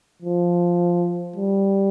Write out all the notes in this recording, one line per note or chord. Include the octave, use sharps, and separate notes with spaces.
F3
G3